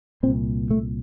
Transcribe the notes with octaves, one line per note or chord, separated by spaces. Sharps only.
C2 A#2 C4
A3